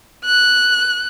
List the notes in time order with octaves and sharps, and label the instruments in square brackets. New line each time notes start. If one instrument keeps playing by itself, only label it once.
[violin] F#6